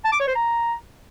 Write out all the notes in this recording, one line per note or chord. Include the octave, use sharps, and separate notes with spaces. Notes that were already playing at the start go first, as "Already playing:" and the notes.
A5
D6
C#5
C5
A#5